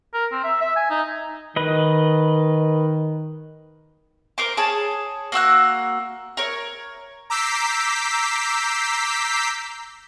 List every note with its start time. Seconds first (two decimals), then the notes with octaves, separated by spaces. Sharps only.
0.14 A#4
0.32 C4
0.44 E5
0.61 E5
0.76 G#5
0.90 D#4
1.56 D#3 B4 D#5
4.38 A#4 C5 D6
4.57 G#4 C#5 A5
5.32 A#3 F#4 E6 F#6
6.37 A#4 C#5
7.30 A#5 D6 E6 G6 B6 C7